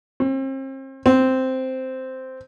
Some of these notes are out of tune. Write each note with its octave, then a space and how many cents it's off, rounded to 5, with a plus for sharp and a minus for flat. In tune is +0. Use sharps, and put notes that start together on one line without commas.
C4 +40
C4 -5